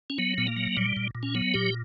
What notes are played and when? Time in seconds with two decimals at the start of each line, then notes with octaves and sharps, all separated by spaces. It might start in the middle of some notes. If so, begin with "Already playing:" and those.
0.10 C#4
0.18 F#3 B3
0.38 A#2 B3
0.47 A#3
0.56 F#3
0.77 A#2 G3
0.96 A#2
1.15 A#2
1.23 C#4
1.35 F#3 B3
1.54 A#2 G4